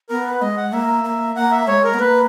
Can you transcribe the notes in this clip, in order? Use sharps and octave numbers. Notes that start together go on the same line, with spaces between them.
B3 A#4
B4
G#3 D#5
F#5
A#3 E5
A#3
A#3 F#5
E5
G#3 C#5
A#4
B3
A#3 B4